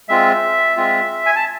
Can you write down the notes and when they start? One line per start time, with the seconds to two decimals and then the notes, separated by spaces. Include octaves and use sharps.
0.09 G#3 C4 F4 E5
0.77 G#3 C4 F4
1.26 G#5
1.36 A5